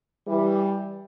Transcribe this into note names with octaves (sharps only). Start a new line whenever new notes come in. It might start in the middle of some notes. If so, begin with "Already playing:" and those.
E3 G3